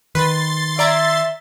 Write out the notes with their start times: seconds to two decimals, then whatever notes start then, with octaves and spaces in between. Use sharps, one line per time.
0.15 D#3 B4 C6 A6
0.79 D5 E5 A#5 G#6